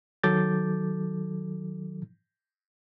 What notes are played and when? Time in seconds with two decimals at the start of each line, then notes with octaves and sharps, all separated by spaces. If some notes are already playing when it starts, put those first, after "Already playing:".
0.23 D#3 F#3 A4 D6 G6 A6